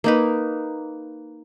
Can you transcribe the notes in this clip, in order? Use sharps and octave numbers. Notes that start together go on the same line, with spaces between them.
A#3 D#4 B4